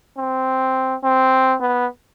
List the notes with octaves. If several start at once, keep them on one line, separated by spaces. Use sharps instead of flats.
C4
C4
B3